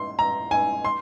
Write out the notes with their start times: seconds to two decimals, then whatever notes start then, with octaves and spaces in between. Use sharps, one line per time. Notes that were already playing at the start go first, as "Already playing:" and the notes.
Already playing: C6
0.19 A#5
0.51 G#5
0.84 C6